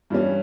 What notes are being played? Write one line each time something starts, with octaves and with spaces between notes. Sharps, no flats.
G2 E3 G3 C#4